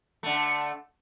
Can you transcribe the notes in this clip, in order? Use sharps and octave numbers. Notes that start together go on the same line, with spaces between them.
D3 A3